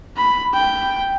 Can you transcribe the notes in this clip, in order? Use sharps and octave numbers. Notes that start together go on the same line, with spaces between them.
B5
G5